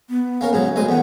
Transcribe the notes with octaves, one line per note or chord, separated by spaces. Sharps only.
B3
A#3 C#4 A#4
G#2 C#3 F#3
D2 G#3 D#6
E2 D#3 F#5